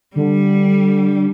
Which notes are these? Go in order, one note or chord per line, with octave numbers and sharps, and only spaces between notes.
D3 G3